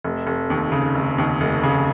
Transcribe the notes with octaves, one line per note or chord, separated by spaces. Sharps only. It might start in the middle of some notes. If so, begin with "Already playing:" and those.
F1
F1
D#2
C#3
F1
D#2
F1
C#3